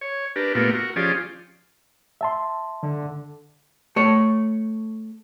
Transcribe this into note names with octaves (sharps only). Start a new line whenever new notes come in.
C#5
D4 G4 A#4 B4
A#2 A3 B3 F4 G4 A#4
F#4 A#4
F3 C#4 F4 G4 G#4 D5
E5 A5 C6
D3
A3 C#5